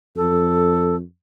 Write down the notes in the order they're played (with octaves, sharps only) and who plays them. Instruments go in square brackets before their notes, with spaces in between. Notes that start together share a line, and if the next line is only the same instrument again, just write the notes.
[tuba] F2 [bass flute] A4